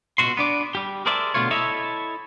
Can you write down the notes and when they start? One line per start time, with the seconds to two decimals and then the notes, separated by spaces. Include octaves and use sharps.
0.18 C#2 B2 F#4 C6
0.37 B3 D4 D5
0.75 G3 G4
1.06 G#4 A#4 C5 D5 E5 A5
1.34 B2 D3 E3 A3 F4 C#5
1.51 E4 A4 C#5 D#5 E5